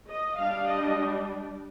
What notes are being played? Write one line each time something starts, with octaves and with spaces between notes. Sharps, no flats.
D#5
G3 D4 F5
D#5